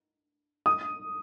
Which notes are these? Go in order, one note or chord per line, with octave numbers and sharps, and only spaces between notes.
D#6